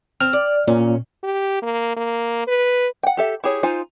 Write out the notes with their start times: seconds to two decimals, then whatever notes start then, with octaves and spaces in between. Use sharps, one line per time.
0.20 C4 F6
0.33 D5
0.68 A#2 C#4
1.24 G4
1.62 A#3
1.97 A#3
2.48 B4
3.03 F#5 G5
3.17 G4 A4 E5
3.44 E4 G4 G#4 C#5
3.63 D#4 F4 C5 G#5